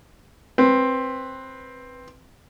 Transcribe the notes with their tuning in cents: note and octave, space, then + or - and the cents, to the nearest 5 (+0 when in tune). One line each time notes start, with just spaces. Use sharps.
C4 +10 B4 +0